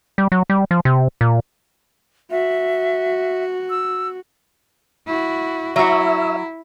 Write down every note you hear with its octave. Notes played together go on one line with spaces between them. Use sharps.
G3
F#3
G3
F3
C3
A#2
F#4 E5
E6
E4 F#4
F#3 E4 F#4 E5